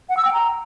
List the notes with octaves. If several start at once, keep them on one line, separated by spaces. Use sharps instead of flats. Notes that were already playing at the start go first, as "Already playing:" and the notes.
F#5
E6
G5
A#5